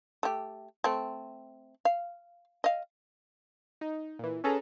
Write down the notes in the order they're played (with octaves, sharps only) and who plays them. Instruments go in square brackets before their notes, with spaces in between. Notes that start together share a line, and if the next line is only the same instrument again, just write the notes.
[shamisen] A3 G4
A3 C4
F5
D#5 F5
[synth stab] D#4
A#2 E3
C#4 G#4 A4 B4 A#5